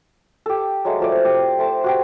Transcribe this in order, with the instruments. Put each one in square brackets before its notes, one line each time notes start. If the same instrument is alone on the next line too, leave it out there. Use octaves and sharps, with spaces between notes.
[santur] G4 A4
F#3 G#3 A3
F3 A3 D5
G4
A3 C5 A5
F#4 G4 G5